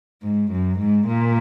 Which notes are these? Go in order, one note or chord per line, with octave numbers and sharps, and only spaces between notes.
G#2
F#2
G#2
A#2